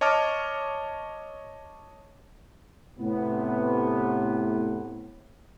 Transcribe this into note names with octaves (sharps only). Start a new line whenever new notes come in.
C#5 D#5 A5 D6 F6
A2 C3 B3